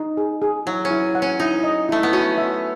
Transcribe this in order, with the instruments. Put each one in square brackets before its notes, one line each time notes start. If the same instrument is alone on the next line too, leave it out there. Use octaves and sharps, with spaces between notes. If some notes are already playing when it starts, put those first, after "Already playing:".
Already playing: [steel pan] D#4
G#4
G#4
[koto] F#3 [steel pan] E4
[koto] C#4
[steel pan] E4
F#5
[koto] C#4
[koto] D#4 [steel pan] E4
[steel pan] D#5
[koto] A3 [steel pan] E4
[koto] B3
[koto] C#4 [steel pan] F#4
[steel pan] E5